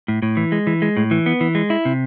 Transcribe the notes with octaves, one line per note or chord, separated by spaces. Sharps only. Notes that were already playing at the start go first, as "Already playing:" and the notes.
A2
A2
E3
G#3
E3
G#3
A2
E3
B3
E3
G#3
E4
C3